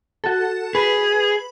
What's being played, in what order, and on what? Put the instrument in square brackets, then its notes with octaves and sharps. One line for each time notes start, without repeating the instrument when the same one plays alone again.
[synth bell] F#4 A4
[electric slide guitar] G#4 [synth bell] B4